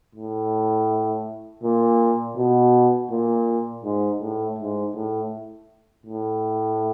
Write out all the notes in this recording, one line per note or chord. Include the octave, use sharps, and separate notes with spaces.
A2
A#2
B2
A#2
G#2
A2
G#2
A2
A2